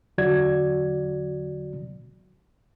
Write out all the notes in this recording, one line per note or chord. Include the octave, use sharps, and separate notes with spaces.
E2 D3 F#3 F#4 D5 G#6